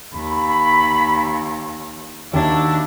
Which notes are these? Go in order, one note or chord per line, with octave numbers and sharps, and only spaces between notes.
D#2 B5
D#2 D4 E4 F#4 E5